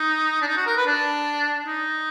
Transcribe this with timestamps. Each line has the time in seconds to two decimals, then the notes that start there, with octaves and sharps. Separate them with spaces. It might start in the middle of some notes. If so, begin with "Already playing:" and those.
Already playing: D#4
0.42 D4
0.47 D#4
0.57 F#4
0.67 A#4
0.77 B4
0.86 D4
1.67 D#4